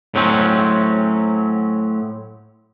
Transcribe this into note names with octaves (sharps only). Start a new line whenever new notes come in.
A2 F#3 C4 C#4